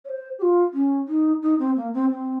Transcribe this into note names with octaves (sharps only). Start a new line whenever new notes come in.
C#5
C5
G4
F4
C#4
D#4
D#4
C4
A#3
C4
C4